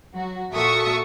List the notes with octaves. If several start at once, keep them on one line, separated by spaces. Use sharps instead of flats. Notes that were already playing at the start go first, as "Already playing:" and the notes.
F#3 F#4
A#2 F#4 A4 E5 C#6 D#6